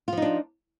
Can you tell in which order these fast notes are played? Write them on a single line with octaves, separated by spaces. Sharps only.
F4 F3 D#4 D4